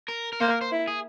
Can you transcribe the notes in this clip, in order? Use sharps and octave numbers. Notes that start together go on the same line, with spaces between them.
A#4
A#4
A#3 C5
A#4
C5
E4
G#4